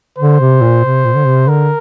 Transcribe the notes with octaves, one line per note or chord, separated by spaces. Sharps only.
D3 C5
C3
A#2
C3
A#2
D3
C3
D3 A#4